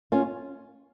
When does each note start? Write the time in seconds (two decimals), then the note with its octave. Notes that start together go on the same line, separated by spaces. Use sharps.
0.12 C#4 F4